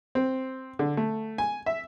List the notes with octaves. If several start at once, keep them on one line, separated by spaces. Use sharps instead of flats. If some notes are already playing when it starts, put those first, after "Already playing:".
C4
D3
A3
G#5
E5